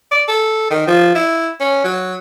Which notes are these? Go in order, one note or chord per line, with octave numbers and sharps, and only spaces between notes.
D5
A4
D#3
F3
E4
C#4
F#3